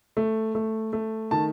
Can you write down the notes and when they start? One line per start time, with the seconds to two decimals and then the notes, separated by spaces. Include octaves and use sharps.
0.17 A3
0.55 A3
0.93 A3
1.31 D#3 A5